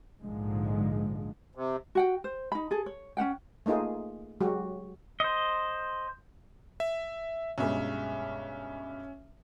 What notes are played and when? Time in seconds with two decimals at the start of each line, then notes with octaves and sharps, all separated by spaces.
0.21 A#1 G#2 D3 F3 G#3
1.55 C3
1.95 F#4 F#5 G5
2.24 C5
2.52 D#4 B5
2.71 G#4 A4
2.86 C#5
3.17 C#4 D4 F#5 G5
3.66 A3 A#3 D#4 F4 G#4
4.40 F#3 G#3 F#4 G4
5.20 C5 D#5
6.80 E5
7.58 B1 G2 G#3 C#4 E5